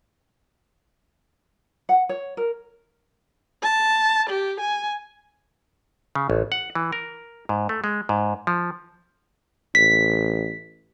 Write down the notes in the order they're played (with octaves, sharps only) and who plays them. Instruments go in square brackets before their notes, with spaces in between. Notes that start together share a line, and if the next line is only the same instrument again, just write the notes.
[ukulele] F#5
C#5
A#4
[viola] A5
G4
G#5
[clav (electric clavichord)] C#3
A1
F#5
E3
A#4
G#2
A3
G#3
G#2
F3
[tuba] A1 [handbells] B6